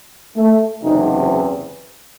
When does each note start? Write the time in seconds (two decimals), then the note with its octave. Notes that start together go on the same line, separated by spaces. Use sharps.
0.37 A3
0.83 F#1 E2 C3 D#4